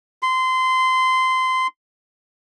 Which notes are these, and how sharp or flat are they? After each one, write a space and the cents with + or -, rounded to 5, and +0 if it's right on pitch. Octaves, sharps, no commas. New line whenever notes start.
C6 -20